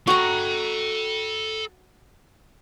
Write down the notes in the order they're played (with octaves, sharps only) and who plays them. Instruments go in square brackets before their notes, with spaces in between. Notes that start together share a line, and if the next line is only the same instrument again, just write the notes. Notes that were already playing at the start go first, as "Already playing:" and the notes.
[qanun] F#4 A#5 [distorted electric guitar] A4 G5 [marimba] C#6